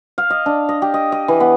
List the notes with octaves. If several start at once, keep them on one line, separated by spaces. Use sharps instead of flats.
F5
D#5
D4
D#5
G4
D#5
D#5
E3
B3